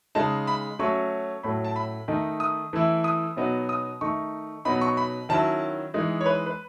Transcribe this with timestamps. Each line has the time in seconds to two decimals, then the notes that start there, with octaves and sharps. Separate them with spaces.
0.15 C#3 G#3 D#4 A5
0.47 B5
0.79 F#3 A3 C#4 C#6
1.43 A2 F#3 A3 B5
1.65 A5
1.76 B5
2.08 D#3 A3 D#4
2.40 D#6
2.73 E3 A3 E4
3.04 D#6
3.36 B2 F#3 B3 D#4
3.69 D#6
4.01 D#3 A3 D#4 C#6
4.65 B2 F#3 B3 D#4 B5
4.81 C#6
4.97 B5
5.29 D#3 F#3 C#4 E4 A5
5.94 E3 G#3 D#4
6.21 C#5
6.26 B4
6.46 B4